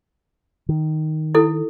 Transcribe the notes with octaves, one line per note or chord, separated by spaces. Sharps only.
D#3
E4 A4